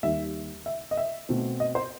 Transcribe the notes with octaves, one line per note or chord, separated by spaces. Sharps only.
D#2 D#3 G3 E5
E5
D#5
E5
B2 A3 C4
D#5
C5